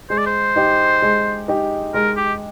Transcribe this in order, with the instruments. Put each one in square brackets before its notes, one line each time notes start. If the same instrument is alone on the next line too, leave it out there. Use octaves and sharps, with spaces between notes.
[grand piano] G#3 [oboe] C5
[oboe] D5
C5
[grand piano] D#4 G4
G#3
D#4 G4
[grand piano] G#3 [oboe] A#4
[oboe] G4